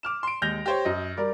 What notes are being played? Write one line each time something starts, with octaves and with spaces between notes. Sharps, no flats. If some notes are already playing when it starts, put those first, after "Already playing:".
D6 F6 E7
C6 D7
D#2 G#3 G6 A#6 F7
G4 C5 C#5
F#2 D#5
G3 A#4 D5